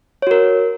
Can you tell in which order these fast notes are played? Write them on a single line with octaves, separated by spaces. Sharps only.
C#5 F#4 A#4